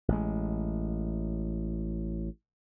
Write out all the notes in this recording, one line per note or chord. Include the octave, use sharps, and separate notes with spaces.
A1 G#3